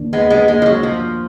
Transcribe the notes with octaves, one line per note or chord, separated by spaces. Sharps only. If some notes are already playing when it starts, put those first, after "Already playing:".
Already playing: D#2 D#3 A#3 D4
D#2 G#3 B3
G#3 B3
D#3 G#3 A#3 D4
F3
F#3
D#2 F3